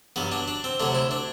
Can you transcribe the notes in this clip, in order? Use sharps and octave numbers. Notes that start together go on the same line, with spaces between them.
G2 F#3 B3
D4
D4
C4
D2 C3 F#3 D4
E4
D4